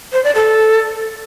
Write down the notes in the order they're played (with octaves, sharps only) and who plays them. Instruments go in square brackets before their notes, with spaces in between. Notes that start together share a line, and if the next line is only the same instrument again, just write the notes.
[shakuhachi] C5
D5
A4